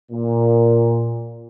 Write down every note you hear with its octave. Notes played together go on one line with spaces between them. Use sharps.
A#2